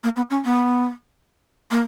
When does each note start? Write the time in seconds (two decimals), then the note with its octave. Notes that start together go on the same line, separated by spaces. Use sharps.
0.03 A#3
0.16 B3
0.30 C#4
0.45 B3
1.71 A#3